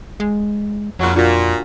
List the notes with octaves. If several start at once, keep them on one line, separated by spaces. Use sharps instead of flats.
G#3
F2 A#2 C#3 F#3
A#2 D4 F4 F#4